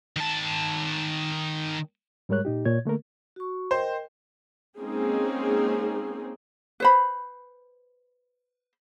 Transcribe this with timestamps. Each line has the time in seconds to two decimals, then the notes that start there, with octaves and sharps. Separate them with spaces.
0.16 D#3 A5
2.29 G#2 G3 G#3 A#4 C#5 F#6
2.45 A#2 D#4 G4
2.65 A#2 C#5 G#6
2.85 D3 A3 A#3 A#4
3.36 F#4 C#6
3.71 A#4 C5 D#5 G5
4.78 G#3 A#3 C4 C#4 D#4 G#4
6.80 B4 C5 B5